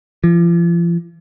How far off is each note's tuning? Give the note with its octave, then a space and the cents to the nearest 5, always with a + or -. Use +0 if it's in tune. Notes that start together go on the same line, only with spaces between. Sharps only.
F3 -40